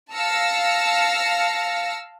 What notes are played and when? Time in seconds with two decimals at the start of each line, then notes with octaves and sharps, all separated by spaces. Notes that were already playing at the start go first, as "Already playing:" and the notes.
0.14 F5 A5 E6 F6 A#6 C#7